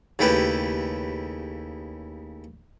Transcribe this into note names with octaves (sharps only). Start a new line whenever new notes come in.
D#2 C#3 A3 E4 G4 B4